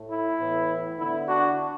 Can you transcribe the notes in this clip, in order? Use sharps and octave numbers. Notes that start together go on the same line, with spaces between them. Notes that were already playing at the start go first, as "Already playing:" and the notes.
Already playing: A2 A3
E4
A2 E3 B3
D3 B3 E4
D4 F#4